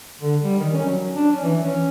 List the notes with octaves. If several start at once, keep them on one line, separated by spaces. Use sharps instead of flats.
D3
G3
D#3
C#4
F#3
D4
C#4
E3
C#4